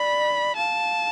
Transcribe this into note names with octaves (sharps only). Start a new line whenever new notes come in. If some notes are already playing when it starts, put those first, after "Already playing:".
Already playing: D5 B5
F5 A5